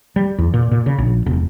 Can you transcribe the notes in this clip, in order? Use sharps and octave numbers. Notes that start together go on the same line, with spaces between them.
G3
E2
A#2
A#2
C#3
A#1
E1